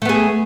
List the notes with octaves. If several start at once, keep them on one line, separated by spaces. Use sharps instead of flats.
A3 B3 G#4